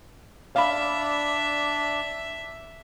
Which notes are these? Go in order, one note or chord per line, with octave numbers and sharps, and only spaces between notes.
D4 D5 E5 F5 B5